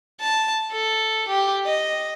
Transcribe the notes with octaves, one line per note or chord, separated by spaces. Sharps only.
A5
A4
G4
D#5